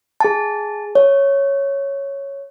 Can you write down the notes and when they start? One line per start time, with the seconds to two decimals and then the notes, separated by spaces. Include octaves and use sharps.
0.20 G#4 A5
0.95 C#5